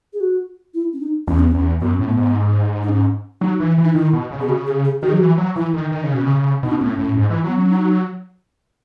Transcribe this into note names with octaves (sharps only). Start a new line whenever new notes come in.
G#4
F#4
E4
C#4
D#4
E2 C#4
B3
E2 C#4
F#2 B3
A2 C#4
B3
G#2
D#4
C#4
F#3 D#4
E3
E3
D#4
D#3 E4
B2
C#3
B2 G#4
C#3 F#4
G#4
G#4
D#3 F#4
G#4
F#3
E3 F#4
F#3
E3 E4
D#3
D#3
C#3
B2 C#4
C#3
B2 D#4
C#4
A2 B3
C#4
A2
G#2
E3
F#3 B3
F#3 C#4
D#4